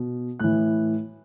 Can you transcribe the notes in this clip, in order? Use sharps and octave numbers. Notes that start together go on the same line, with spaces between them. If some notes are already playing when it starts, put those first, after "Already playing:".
Already playing: B2
A2 E3 F#6